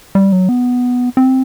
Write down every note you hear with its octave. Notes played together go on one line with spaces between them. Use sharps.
G3
F#3
B3
C4